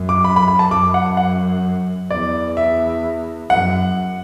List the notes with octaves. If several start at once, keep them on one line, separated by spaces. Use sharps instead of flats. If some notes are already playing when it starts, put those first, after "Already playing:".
Already playing: F#2
D6
B5
B5
B5
A5
F#2 D6
F#5
F#5
E2 D5
E5
F#2 F#5